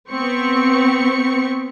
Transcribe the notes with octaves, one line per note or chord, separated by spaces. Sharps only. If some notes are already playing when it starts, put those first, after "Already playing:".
B3 C4 C#6 C#7